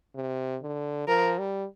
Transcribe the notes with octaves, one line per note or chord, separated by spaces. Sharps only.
C3
D3
F3 A#4
G3